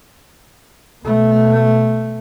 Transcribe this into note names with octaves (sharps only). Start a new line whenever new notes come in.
B2 A3